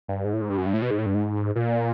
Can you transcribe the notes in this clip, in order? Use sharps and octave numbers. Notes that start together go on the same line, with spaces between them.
G2
G#2
A2
G#2
G2
F#2
G2
A2
B2
G#2
A2
G2
G#2
A#2